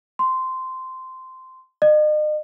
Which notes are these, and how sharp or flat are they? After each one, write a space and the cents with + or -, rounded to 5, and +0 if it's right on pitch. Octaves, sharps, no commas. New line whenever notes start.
C6 -10
D#5 -40